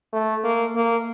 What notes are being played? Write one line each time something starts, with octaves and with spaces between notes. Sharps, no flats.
A3
A#3
A#3